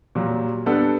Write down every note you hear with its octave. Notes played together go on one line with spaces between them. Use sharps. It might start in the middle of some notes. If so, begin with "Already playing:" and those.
A#2 F#3 G3
G3 B3 D4 A4 F#5